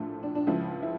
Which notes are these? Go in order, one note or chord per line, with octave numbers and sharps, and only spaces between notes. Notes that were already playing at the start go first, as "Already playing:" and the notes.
Already playing: A#1 A2 F3 A3
D4
D4
C#2 C#3 F3 E4
E4